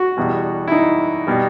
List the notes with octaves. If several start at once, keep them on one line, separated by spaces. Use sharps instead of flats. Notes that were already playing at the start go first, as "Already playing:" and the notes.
Already playing: F#4
E2 B2 G3
E4
D#4
B2 G3